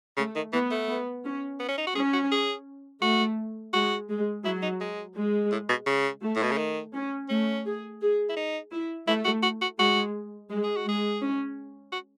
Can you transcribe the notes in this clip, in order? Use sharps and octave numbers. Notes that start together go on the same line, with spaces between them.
C#3 A3
D#3
E3 B3
A3
B3
C#4
B3
C#4
D#4
F#4
C#4 G#4
F#4
G#4
A3 F#4
G#3 F#4
G#3
F#3 E4
D#4
G#3
G#3
A2
B2
C#3
A3
A2
B2
C#3
D#3
C#4
A3 C#4
G#4
G#4
E4
D#4
E4
A3 E4
F#4
F#4
F#4
G#3 F#4
G#3
G#4
F#4
G#3 G#4
C#4
F#4